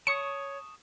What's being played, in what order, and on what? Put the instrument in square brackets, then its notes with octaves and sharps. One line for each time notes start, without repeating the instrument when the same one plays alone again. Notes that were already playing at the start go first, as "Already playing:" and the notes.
[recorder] C#5 [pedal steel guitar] A5 C#6 D#6 [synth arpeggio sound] C#7